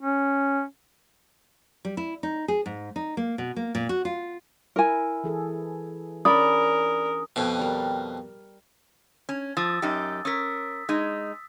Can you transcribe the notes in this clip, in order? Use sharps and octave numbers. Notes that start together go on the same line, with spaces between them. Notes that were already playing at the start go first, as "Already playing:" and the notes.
C#4
G3
E4
D#4
G#4
G#2
D#4
A#3
B2
A#3
A#2
F#4
F4
E4 A#4 E5 G#5
E3 G#4 A4
C#4 D4 A#4 D5 B5 D#6
F2 B2 G5 G#5
G3 A#4
C#4
F3 D#6 E6 A6
F#2 D#4 G4
C#4 A#4 D#6 E6 B6
G#3 D#4